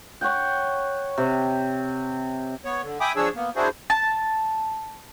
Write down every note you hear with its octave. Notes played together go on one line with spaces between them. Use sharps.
C#5 F#5 G5
C3
B3 C#5
D3
E5 G5 G#5 B5 D6 D#6
F3 D4 G#4 C#5 E6
A#3 B3
D4 E4 F#4 G#4 C5
A5